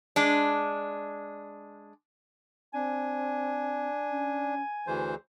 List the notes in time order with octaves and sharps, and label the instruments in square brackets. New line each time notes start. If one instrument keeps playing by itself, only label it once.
[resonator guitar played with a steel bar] G#3 D4
[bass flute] C4 [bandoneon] D4 [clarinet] G#5
[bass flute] C#4
[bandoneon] D2 E3 C5 [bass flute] G#4